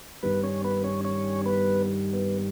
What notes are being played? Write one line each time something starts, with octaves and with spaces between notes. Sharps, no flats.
G2 D#3 G3 B3 B4
C#4 C#5
B3 B4
C#4 C#5
C#4 C#5
B3 B4
B3